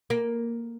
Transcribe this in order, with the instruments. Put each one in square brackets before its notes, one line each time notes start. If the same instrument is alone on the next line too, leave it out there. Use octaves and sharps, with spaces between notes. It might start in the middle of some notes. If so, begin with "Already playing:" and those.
[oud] A#3